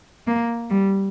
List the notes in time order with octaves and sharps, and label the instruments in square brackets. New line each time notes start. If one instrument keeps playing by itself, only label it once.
[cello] A#3
G3